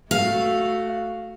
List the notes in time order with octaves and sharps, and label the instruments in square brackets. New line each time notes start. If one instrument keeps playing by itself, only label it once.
[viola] A3 F#4 [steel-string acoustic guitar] F5